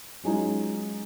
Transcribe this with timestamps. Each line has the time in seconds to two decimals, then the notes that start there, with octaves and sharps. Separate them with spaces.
0.23 F#3 G#3 C#4 D#4 F4